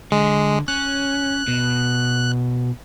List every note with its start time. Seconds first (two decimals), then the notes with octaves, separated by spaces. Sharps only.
0.12 D3 G#3
0.68 C#4 F#6
1.48 B2